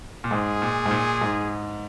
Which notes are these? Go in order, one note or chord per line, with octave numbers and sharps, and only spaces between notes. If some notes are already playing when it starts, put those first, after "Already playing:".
A#2
G#2 G#4
A#2
G#2
A#2
G#2